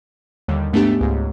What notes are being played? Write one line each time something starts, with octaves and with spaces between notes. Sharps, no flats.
D#2 D3 G3
G#2 A3 B3 D4 G4
C#2 G#2